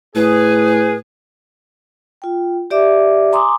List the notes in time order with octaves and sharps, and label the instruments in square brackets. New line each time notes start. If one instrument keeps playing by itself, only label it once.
[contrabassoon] A2 [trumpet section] G#4 [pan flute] B4
[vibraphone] F4 G5
G4 D5 E5 D6
G#5 A#5 C6 D6 D#6